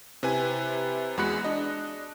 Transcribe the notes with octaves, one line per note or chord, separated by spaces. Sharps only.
C3 E4 B4 G#5
E2 G#3 F#4 B5 F#6 C#7
D4 D#5